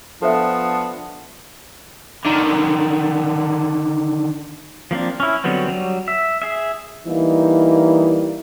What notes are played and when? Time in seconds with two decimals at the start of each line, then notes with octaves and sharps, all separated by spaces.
0.22 F3 B3 D4 A4 C5 E5
2.25 D3 D#3
4.91 F3 A#3 C4 D4
5.20 C#4 E4
5.44 D3 F#3 G3 B3 C4
5.69 F#3 G3
6.08 E5
6.42 G#4 E5
7.07 E3 G3 A#3 D#4